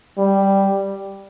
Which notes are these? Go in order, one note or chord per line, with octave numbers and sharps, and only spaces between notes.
G3